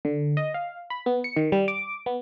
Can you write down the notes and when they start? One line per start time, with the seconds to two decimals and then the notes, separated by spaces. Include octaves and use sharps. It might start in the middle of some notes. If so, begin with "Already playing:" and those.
0.05 D3
0.37 D#5
0.54 F5
0.90 B5
1.06 B3
1.24 C#7
1.36 D#3
1.52 G3
1.68 D6
2.06 B3